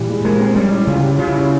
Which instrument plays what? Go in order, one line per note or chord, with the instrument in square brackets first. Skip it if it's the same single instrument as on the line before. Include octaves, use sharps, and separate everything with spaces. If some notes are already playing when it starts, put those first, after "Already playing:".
Already playing: [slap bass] A#2 [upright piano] E3 G3
[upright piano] G#3
[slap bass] G#3 [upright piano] A#3
[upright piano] C4
[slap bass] G3 [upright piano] C#4
[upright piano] E4
[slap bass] C#3 [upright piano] F4
[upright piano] G4
[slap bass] C#3 [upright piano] F4
[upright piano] E4
F4